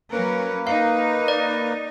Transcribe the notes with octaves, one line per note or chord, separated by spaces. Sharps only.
F#3 A#3 C#4 A#4 B4
D#4 F5
D5